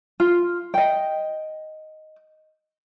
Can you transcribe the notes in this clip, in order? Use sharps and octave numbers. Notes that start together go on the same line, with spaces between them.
F4
D#5 G5